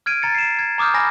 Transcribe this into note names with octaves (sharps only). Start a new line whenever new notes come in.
F6 G#6 D7 D#7
A#5 A6 C#7
C7 E7
G#6
A#5 D6 D#6 F6 G6
G#5 B5 F6 A#6